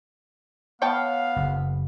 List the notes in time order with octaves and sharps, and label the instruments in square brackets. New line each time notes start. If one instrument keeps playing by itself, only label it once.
[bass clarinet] B3 [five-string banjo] C#5 G5 A5 [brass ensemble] F5
[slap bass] F#1